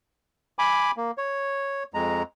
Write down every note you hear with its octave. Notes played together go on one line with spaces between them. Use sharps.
G#5 B5 D6
A#3
C#5
F2 G#3 A#5